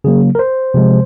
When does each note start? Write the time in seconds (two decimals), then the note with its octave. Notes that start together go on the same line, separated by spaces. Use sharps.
0.04 C#3 F#3 A#3 G#4
0.35 A#4
0.39 C5
0.74 C3 F3 G#3